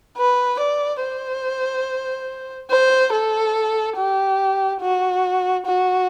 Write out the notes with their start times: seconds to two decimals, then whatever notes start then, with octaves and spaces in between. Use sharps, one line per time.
0.17 B4
0.60 D5
1.02 C5
2.71 C5
3.13 A4
3.97 G4
4.81 F#4
5.66 F#4